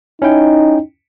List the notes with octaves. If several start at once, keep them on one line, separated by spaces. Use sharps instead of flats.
C#4 D#4 E4 G5